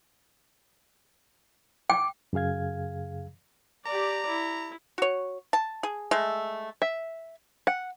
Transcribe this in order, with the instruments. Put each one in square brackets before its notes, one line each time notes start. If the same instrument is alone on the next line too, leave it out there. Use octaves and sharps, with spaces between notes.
[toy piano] G5 [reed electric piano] D6
[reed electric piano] F#2 C#3 G#4 F5 G#6
[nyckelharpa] G4 D5 [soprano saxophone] A#5
[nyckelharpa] E4
[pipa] F#4 C#5
A5
G#4
G#3 A3
[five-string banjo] E5
F#5